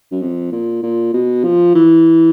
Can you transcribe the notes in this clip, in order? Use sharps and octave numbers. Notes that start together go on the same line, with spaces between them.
F#2
F2
A#2
A#2
B2
F3
E3